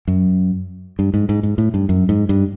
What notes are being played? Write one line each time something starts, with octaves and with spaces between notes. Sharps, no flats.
F#2
G2
G#2
G#2
G#2
A2
G2
F#2
G#2
G2